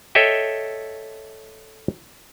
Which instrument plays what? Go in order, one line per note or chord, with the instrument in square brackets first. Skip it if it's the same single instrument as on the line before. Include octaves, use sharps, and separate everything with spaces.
[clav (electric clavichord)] A4 C#5 D#5 E5 G5